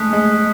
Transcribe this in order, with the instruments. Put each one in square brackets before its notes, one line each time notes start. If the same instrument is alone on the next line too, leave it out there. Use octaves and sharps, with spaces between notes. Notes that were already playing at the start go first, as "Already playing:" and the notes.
Already playing: [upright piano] G#3 A3 [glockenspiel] D#6 F#6 B6
[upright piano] G#3